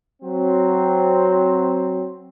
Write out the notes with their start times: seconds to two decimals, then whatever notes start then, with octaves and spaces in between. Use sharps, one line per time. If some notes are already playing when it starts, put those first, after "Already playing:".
0.23 F#3 C4